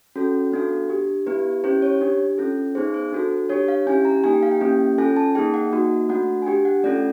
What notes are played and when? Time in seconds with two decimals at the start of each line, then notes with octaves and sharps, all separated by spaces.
0.16 C#4 F#4 A4
0.52 B3 D4 F#4 A4
0.89 D4 G4
1.26 B3 E4 G4 B4
1.64 C#4 E4 G4 C5
1.82 C#5
2.01 D4 G4
2.38 C#4 F4 A4
2.75 B3 D#4 G#4 C5
2.94 C5
3.12 D4 F#4 A4
3.49 D4 G4 C#5
3.68 F5
3.87 C#4 E4 G4 G#5
4.05 A#5
4.24 A#3 D#4 G4 G#5
4.33 G5
4.43 F5
4.51 G5
4.61 A#3 C#4 E4 G4
4.98 C#4 F4 A4 G#5
5.16 A5
5.35 A#3 D#4 G#4 G5
5.54 F#5
5.72 A#3 D#4 F#4
6.09 A3 D4 F#4 F#5
6.42 G#5
6.46 D4 G4 G5
6.65 F#5
6.83 A3 C#4 F4 A4 D5